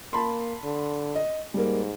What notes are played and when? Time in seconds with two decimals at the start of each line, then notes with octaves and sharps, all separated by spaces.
0.13 A#3 A5 B5 C6
0.64 D3
1.16 D#5
1.54 G#2 G3 A#3